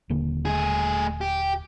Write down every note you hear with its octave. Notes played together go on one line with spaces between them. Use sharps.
D#1 D3 A#3
A3 G#4
G4